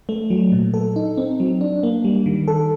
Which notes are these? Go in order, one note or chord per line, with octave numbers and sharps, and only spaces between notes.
A3
F#3
A#2
A4
D#4
C4
F#3
D4
A#3
G3
D#3
A4